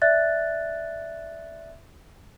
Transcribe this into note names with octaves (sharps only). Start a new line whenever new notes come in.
D5 E5 F#6 A6